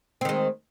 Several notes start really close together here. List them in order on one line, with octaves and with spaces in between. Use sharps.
C4 D#3 G#3